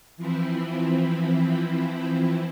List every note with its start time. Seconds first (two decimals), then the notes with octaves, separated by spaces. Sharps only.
0.17 E3 F3 C4 E4